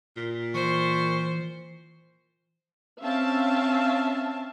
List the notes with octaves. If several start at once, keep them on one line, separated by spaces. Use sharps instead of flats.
A#2
E3 C5 C#6
C4 C#4 E5 F5 A5